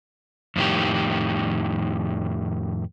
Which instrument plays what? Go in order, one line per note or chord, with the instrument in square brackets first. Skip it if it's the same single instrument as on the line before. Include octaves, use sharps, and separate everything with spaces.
[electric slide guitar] F2 A2 D#3 G4